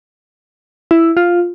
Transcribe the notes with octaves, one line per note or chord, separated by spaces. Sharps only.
E4
F4